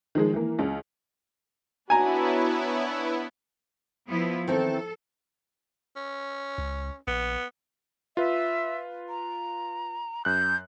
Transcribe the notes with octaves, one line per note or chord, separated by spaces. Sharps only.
D#3 F3 G#3 G#4
E3 A#3
C#2
B3 D4 E4 F#4 B4 C#5 G#5 A#5
F3 B3 E4
D#3 E3 C4 A4
C#4
C#2
A#1 B3
F4 B4 E5
A#5
F#2 F#6 G6